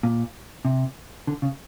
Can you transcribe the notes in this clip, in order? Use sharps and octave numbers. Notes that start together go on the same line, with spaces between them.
A#2
C3
D3
C#3